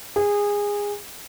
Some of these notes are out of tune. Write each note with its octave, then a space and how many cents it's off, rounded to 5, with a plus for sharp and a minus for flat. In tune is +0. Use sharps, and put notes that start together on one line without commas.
G#4 -20